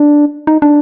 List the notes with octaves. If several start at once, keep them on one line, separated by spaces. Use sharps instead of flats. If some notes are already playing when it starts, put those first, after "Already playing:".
Already playing: D4
D#4
D4